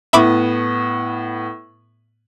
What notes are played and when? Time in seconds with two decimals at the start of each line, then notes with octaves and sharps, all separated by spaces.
0.13 A2 B3 E5 B5 D6